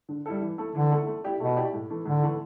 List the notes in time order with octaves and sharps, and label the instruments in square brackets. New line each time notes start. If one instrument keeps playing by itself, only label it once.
[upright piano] D3
G3 E4 A4
E3
A3 E4 A4
[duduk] D3 [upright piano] E3
[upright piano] A3 E4 A4
A3
E4 G4 D5
[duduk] B2 [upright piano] A3
[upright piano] E4 G4 D5
A2
E3 A3
[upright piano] A2 [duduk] D3
[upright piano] E3 A3